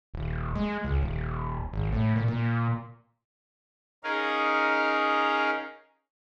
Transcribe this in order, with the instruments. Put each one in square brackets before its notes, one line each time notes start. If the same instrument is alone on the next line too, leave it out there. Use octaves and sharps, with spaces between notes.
[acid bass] D#1
G#3
C#2
D#1
G#1
A2
A#2
A#2
[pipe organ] C#4 D#4 G#4 A#4 C#5 F5